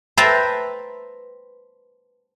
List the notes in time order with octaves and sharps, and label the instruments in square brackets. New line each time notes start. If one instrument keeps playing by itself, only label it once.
[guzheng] B4 C5 E5 G5 A5 A#5